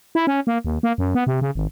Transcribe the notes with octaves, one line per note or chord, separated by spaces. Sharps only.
E4
C#4
A#3
D#2
A#3
F#2
B3
C3
C#3
G#1